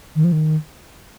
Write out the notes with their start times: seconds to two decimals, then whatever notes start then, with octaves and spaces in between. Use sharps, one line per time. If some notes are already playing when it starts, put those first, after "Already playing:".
0.15 D#3
0.24 F3
0.32 D#3